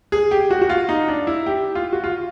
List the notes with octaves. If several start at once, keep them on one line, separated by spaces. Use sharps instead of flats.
G#4
G4
F#4
F#4
F4
D#4
D4
E4
G4
F4
F#4
F4